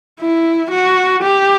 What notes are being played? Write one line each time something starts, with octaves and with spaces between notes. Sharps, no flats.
E4
F#4
G4